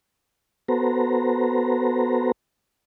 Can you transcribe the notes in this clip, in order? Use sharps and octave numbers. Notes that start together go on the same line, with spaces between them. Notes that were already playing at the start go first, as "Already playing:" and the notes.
B3 F#4 A4 B4 C5 A#5